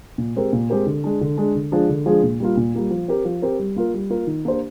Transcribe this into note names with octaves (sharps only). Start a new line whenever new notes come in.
A#2
G#3 C4 G4 A#4
A#2
G#3 C4 G4 A#4
D3
G#3 D4
D3
G#3 D4
D3
F3 G#3 D4 G#4
D3
F3 G#3 D4 G#4
A#2
G3 A#3 F4
A#2
G3 A#3 F4
F3
C4 G4 A#4
F3
C4 G4 A#4
G3
A#3 F4 A#4
G3
A#3 F4 A#4
D#3
A#3 D4 G4 C5